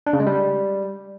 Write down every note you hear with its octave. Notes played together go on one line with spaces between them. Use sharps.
D4
C#3
G#3
G3